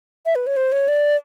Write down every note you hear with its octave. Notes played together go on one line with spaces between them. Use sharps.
E5
B4
C#5
C5
C#5
D5